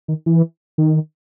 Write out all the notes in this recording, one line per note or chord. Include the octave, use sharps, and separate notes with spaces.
D#3
E3
D#3